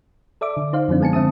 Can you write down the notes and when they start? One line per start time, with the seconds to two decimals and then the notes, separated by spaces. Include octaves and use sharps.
0.41 A4 D5 E5 D6
0.57 D3
0.73 D#4 C5 F5
0.88 F#2 D3 F3 C4 D4
1.00 G#3 B3 G#5 A5 C#7
1.13 D3 C4 E5 A5 D#6